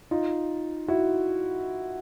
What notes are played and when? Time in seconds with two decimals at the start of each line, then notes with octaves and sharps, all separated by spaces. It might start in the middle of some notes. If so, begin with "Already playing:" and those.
0.11 D#4 F4
0.88 E4 F#4